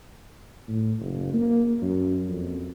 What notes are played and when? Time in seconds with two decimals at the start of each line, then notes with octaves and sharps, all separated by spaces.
0.68 A2
0.99 F#1
1.33 A#3
1.82 F#2
2.29 F2